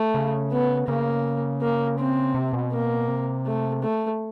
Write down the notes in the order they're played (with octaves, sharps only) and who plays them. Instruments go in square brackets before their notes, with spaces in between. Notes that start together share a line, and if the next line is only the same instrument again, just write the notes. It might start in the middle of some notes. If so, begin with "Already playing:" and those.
Already playing: [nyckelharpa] A3
[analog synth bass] C#3
[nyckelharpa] B3
[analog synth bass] C#3 [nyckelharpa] A#3
[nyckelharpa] A#3
C4
[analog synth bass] C3
B2
[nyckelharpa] A#3
[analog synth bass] C3
[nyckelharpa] A3
A3